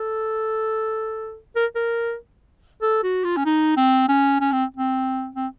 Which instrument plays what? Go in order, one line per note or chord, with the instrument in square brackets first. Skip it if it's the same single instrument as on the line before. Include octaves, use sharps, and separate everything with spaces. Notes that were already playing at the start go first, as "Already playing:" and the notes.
Already playing: [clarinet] A4
A#4
A#4
A4
F#4
F4
C#4
D#4
C4
C#4
C#4
C4
C4
C4